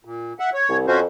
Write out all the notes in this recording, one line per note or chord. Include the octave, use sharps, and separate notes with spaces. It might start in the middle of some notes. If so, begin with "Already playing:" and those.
A#2
E5 F#5
C#5
C2
F2 C#4 F#4 C5